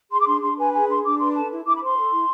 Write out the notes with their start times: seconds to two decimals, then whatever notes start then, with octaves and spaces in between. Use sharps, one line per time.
0.11 G#4 C6
0.20 D6
0.26 D4 C6
0.41 D4 C6
0.57 B4 G#5
0.72 G#4 G#5
0.88 D4 C6
1.04 D4 D6
1.19 B4 C6
1.35 A4 A5
1.50 E4
1.65 E4 D6
1.75 B5
1.81 C5 C6
1.96 A4
2.12 E4